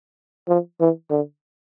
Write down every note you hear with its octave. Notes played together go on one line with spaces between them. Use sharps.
F3
E3
D3